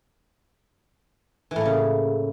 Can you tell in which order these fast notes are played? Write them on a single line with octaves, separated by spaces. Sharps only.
E3 A2 A#3 C#3